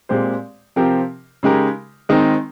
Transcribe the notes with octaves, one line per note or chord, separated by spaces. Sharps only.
A#2 G#3 C4 G4 C5
C3 F3 C4 G4 A#4
C#3 G#3 D#4 G4 A#4
D#3 G#3 C4 D#4 A#4